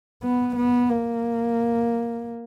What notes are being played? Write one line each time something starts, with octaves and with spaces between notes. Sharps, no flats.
B3
B3
A#3